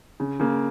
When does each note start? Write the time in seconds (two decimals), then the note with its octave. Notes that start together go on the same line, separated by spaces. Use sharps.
0.20 C#3
0.40 C#3 A#3